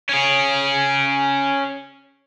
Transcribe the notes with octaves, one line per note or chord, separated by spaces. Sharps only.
C#4 G#4